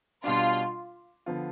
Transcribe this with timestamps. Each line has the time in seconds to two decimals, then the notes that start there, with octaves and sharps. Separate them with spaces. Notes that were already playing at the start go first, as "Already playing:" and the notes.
0.24 B2 G3 D4 F4
1.26 D3 F3 B3 F4